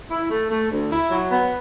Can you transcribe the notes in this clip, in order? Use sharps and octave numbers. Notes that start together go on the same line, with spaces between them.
E4
A3
A3
D2
E4
F#3
B3